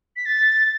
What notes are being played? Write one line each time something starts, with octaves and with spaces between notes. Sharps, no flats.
B6
A6